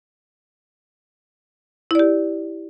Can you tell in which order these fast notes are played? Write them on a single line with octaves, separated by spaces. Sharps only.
E4 D5 G4